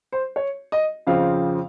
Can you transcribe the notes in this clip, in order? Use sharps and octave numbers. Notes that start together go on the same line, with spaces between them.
C5
C#5
D#5
F2 C#3 F3 C4 F5